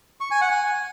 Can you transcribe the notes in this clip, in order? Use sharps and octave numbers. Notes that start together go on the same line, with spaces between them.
C#6
G#5
F#5
G#5